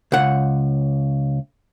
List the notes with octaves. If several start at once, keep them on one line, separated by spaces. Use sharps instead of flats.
C#2 F#5